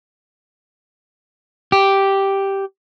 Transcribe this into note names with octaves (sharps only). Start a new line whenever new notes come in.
G4